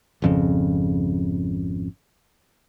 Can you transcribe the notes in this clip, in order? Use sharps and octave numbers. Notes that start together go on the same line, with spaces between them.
G#1 F2 C#3